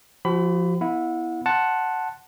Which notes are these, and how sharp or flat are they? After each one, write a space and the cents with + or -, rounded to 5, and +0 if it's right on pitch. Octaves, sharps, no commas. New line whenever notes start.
F3 +0 F#4 +45 B5 +20
B3 +0 E4 +0 F#5 -30
F#5 +0 A5 +0 C6 +10